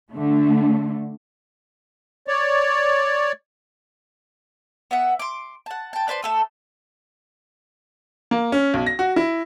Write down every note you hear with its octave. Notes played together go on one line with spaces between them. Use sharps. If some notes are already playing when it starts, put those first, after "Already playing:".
D3 A3
C#5 D5
B3 E5 F#5
C6 D6
F#5 A5
G5 A5
D4 B4 C5 C6
A3 A4 D#6
A#3
C#4
B1
A#6
F#4
E4